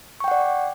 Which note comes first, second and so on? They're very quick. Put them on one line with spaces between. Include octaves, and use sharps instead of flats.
C#6 G5 F#5 D5